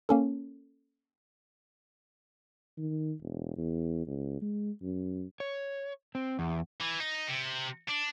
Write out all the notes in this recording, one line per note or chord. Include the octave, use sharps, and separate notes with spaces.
A#3 C#4 A4
D#3
E1
E2
C#2
G#3
F#2
C#5
C4
E2
E3
D#4
C3
D4